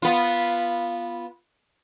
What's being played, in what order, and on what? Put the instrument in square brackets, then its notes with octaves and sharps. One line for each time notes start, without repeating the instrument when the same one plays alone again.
[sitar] B3 F4